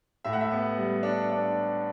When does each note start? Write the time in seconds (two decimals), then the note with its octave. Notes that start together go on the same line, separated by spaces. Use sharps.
0.24 A2 E5
0.33 F#5
0.41 E5
0.51 B3
0.77 G3
1.03 D4
1.30 D4